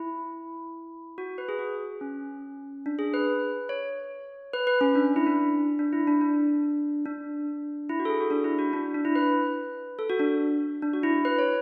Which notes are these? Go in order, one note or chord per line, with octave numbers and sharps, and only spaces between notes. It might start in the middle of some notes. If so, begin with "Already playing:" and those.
Already playing: E4
F#4
B4
G#4
F#4
C#4
D4
G#4
B4
C#5
B4
B4
C#4
D4
E4
D4
D4
E4
D4
D4
D4
E4
F#4
A4
G#4
F#4
D4
E4
F#4
D4
D4
E4
B4
A4
F#4
D4
D4
F#4
E4
B4
C#5